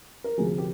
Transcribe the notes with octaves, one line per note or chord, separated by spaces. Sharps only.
A#4
D2 C3 F3 G#4
G4